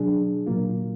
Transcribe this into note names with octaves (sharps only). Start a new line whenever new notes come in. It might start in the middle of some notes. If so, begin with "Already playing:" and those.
Already playing: B2 F#3 D4 G#4
A#2 F#3 A#3 F4